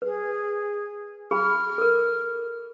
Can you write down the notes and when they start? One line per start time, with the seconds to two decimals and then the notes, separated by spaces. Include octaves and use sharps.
0.02 G#4 B4
1.31 G#4 B5 F6
1.78 A4 A#4